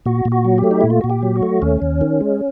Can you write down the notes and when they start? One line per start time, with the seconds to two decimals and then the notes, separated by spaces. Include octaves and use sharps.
0.06 A#2 F#4
0.25 A#2
0.32 F#4
0.45 F#3
0.58 G4
0.64 A3
0.71 D#4
0.81 A#2 E4
0.90 F4
1.01 A#2 F#4
1.10 G4
1.22 F#3
1.36 F#4
1.43 A3
1.62 D#2 C#4
1.82 D#2
2.01 D#3
2.21 G#3